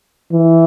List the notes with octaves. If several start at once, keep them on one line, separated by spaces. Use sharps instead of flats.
E3